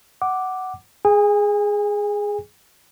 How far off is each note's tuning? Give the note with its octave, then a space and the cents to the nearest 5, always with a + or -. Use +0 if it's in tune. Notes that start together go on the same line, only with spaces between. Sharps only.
F#5 +10 D6 +0
G#4 +0 G#5 -35